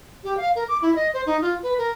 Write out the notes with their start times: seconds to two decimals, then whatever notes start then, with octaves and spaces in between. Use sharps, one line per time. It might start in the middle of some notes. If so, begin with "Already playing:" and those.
0.24 G4
0.37 F5
0.55 A#4
0.68 D6
0.82 E4
0.95 D#5
1.14 C5
1.26 D#4
1.42 F4
1.63 B4
1.78 A#4